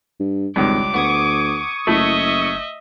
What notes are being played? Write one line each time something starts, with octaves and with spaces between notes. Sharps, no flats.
G2
G#1 C#2 G2 D6
D2 B3 C#6 D#6 G#6
F#1 A3 E4 D#5 E5